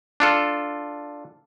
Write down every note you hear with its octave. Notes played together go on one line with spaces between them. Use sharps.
D4 F4 A4